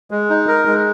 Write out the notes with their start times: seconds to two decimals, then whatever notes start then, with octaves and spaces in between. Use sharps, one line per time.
0.11 G#3
0.30 D#4
0.48 A#4
0.66 G#3